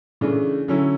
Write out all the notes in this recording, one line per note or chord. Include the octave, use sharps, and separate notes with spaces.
C#3 E3 A3 D4
D3 F#3 C#4 E4